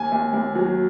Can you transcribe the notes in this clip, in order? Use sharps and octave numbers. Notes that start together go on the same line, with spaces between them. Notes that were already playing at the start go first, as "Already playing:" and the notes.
Already playing: D#2 G#5
D#2
D#2
F#3